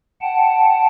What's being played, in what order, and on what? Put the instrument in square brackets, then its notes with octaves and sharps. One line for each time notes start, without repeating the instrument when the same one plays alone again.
[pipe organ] F#5 G5 A5